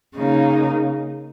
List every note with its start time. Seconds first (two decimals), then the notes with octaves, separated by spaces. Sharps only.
0.15 C#3 A#3 D#4